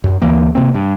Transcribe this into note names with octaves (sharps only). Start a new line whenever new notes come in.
F#2
D2 E3 A#3
C3 A#3 C4
G2